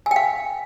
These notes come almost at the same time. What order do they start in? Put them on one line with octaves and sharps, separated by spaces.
G#5 G5 F5